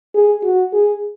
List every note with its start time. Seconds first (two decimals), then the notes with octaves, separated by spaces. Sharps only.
0.15 G#4
0.43 F#4
0.73 G#4